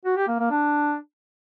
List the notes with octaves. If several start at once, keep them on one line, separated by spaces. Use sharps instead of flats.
F#4
G4
A#3
A#3
D4